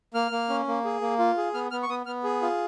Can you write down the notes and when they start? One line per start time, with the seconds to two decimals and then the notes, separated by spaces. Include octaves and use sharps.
0.14 A#3 F6
0.31 A#3
0.49 C#4
0.67 A#3
0.84 G#4
1.01 A#3
1.19 F4
1.37 G#4
1.54 B3 F6
1.71 B3 F6
1.83 C#6
1.89 B3 D#6
2.06 B3 F6
2.24 G#4
2.42 F4